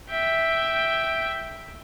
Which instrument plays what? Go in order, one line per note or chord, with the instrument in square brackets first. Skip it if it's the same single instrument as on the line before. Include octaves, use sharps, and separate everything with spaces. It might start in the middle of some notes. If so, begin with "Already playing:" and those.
[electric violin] E5 G5